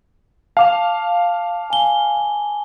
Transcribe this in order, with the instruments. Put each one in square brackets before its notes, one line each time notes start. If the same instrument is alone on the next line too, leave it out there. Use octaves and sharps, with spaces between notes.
[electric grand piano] F5 [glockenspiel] A5 D6 F7
[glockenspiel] G#5 G7